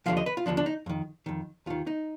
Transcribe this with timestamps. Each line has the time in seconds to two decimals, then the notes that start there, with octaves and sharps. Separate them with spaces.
0.06 D#2 D3 F3 F5
0.17 D#5
0.26 B4
0.37 F4
0.46 D#2 D3 F3 D4
0.57 D4
0.66 D#4
0.86 F2 D#3
1.26 F2 D#3
1.66 D#2 D#3 F4
1.87 D#4